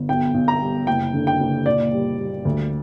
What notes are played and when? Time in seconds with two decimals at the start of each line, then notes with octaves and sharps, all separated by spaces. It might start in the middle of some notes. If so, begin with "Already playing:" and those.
Already playing: G1
0.09 B1 G5
0.34 B1
0.48 A#5
0.61 G3
0.87 F#1 G5
1.14 D3
1.27 G5
1.40 F#1
1.66 A#2 D5
1.92 G3
2.19 G3
2.45 D2